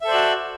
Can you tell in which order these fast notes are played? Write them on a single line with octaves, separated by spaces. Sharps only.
E5 A4 C5 D5 F#4